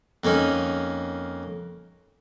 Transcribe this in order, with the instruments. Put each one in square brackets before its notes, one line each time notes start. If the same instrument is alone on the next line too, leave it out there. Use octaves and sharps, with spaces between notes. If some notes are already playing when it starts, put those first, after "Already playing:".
[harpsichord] F2 A#3 C#4 D#4